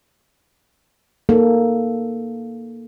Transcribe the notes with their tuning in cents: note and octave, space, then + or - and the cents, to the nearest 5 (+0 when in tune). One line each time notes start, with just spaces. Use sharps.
A#3 +0 D#4 +0 A4 -5